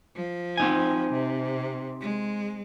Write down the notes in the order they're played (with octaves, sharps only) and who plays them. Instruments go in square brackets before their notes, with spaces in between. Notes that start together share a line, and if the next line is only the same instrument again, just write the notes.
[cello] F3
[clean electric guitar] C4 D#4 G#5
[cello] C3
G#3